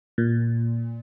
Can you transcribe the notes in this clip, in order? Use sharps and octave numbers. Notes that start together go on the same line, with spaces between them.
A#2